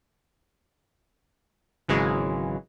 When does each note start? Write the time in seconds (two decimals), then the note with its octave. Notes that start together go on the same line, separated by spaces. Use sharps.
1.89 G#1 C#3 E3 F#3 G#3